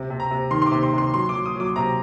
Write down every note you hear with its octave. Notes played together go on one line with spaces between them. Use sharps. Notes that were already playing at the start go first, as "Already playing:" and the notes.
Already playing: C3
C3
A#5
C3
D#3 C6
C6
D6
C3
C6
C3 C6
F#3 C6
F#3 D6
D#6
F#3 D6
C3 A#5